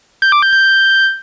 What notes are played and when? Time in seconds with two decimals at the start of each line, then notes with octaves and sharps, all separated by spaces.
0.22 G6
0.32 D6
0.42 G6
0.53 G6